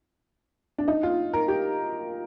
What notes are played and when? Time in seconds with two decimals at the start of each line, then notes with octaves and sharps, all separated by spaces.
0.78 D4
0.88 D#4
1.03 F4
1.33 A#4
1.48 G4